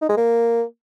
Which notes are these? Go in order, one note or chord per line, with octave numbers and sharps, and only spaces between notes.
D#4
G#3
A#3